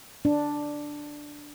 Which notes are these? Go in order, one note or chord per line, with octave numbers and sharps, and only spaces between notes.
D4